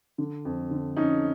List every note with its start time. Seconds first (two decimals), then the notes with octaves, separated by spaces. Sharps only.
0.18 D3
0.45 F2
0.71 D3
0.96 F2 C#4 D#4